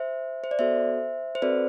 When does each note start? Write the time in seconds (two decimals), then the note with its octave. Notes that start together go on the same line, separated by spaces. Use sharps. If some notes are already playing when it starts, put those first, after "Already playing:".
Already playing: C5 E5
0.44 C5
0.51 D5
0.59 B3 F#4 A4 C5 E5
1.35 C5
1.42 C4 F#4 A4 B4 D5